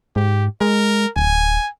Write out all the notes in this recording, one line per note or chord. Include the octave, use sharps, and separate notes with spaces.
G#2 G4
G#3 A#4
D1 G#5